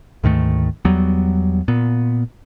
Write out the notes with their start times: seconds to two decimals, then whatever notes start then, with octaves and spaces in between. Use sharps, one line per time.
0.24 D2 G#2 D#3 A3
0.85 E2 F#3 G3 B3
1.68 A#2 B3